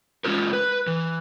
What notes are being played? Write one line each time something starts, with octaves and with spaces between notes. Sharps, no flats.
G#3 C#4 F4 A#4
B4
E3